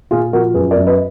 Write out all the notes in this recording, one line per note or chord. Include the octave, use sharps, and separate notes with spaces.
A#2 F4 G#4
F3 F#4 A#4
F#2 G#4 B4
A#4 D5
F#2
B4 D#5